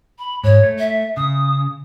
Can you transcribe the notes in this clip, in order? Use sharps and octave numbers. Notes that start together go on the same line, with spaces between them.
B5
G#2 C#5
A3
E5
C#3 D#6